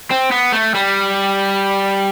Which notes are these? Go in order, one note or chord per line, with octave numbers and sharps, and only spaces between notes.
C4
B3
A3
G3